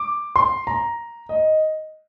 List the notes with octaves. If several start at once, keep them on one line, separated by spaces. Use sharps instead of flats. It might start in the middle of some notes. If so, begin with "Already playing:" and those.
Already playing: D6
C6
A#5
D#5